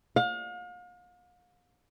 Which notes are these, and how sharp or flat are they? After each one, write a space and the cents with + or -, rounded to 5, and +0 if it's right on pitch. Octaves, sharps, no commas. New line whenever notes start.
F5 +40